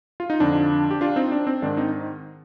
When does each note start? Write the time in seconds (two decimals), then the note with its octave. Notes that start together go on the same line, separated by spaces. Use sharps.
0.20 F4
0.30 D#4
0.40 F2 D3 F3 D4
0.91 G4
1.01 D4 F4
1.16 C4 D#4
1.32 D4
1.47 C4
1.62 G#2 D#3 D4
1.77 C4 D#4